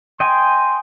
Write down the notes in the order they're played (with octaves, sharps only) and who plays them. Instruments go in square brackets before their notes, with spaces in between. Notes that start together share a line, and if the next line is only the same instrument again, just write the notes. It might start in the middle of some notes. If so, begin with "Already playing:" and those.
[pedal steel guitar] D#5 G5 G#5 [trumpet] C6